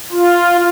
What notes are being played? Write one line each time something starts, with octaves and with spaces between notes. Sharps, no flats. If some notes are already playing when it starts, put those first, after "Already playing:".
F4